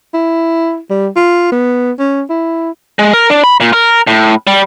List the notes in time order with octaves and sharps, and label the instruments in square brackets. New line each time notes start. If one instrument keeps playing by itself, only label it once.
[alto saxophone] E4
G3
F4
B3
C#4
E4
[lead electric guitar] G#3
A#4
D4
B5
A#2
A#4
A2
G3